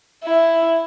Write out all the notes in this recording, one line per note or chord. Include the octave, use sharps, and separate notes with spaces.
E4